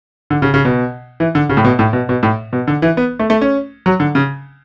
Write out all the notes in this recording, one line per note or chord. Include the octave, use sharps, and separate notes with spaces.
D3
C#3
C#3
B2
E3
D3
C#3
A2
B2
A2
B2
B2
A2
B2
D3
E3
B3
A3
A3
C#4
F#3
D3
C#3